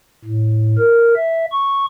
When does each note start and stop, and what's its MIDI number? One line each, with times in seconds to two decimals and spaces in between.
0.25 0.77 45
0.79 1.15 70
1.16 1.46 76
1.52 1.85 85